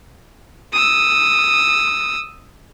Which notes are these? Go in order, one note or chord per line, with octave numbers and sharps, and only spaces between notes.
D#6 E6